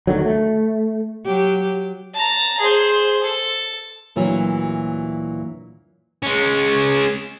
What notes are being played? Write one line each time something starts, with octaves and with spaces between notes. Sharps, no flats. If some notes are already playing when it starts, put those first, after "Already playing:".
D2 D3 D#3 F#3
A3
F#3 G4
A5 A#5
G#4 C5
A4
D2 A#2 E3 F#3
G#3 C#4